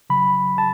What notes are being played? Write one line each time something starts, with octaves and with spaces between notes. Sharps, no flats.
C#3 F#3 B5
C#3 A5